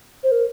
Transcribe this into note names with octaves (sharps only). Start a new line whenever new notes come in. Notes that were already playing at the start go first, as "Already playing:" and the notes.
C5
A#4